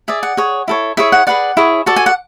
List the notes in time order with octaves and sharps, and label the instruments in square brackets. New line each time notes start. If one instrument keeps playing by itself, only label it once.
[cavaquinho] G#4 D5 E5
F#5
G#4 C#5
E4 A4 C#5
E4 G#4 C#5 E5
F#5
G#4 B4 D5 F#5
E4 G#4 C#5
F#4 A4 D5 A5
G#5
F#5